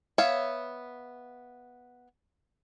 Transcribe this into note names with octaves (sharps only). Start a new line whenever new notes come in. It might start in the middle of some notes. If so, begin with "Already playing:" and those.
B3 C#5 E5 F5